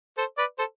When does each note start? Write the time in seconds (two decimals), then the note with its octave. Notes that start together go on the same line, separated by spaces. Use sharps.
0.18 A4 C5
0.38 B4 D5
0.58 A4 C5